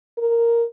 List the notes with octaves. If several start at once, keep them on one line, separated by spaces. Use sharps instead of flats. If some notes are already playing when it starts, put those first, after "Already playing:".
A#4